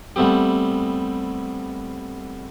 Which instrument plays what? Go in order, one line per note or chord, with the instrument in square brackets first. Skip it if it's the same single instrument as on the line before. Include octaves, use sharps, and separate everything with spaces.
[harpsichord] G3 A3 B3 C4 G4